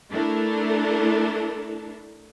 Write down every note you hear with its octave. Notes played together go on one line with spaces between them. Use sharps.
A3 D4 E4 A4 A#4